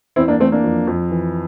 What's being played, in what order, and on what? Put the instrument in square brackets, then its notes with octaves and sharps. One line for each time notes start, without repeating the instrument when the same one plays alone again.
[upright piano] E2 C4 E4
A#3 D4
E3 A3 C4
A#3 D4
F2
F2
E3